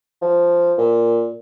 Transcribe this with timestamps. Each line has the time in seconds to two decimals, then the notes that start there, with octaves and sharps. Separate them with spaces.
0.21 F3
0.78 A#2